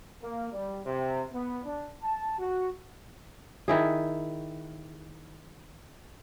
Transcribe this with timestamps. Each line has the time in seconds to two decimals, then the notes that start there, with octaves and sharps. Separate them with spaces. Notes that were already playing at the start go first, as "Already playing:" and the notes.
0.22 A#3
0.51 G3
0.84 C3
1.32 B3
1.64 D4
2.02 A5
2.38 F#4
3.68 D#3 E4 G#4